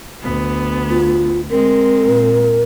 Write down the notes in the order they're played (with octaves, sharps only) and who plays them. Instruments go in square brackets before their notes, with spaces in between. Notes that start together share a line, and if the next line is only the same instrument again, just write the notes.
[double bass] D2 [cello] B3
[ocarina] F4
[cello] G#3 C4 [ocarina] A#4
[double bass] A#2